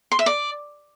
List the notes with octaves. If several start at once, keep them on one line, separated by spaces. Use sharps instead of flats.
C6
E5
D5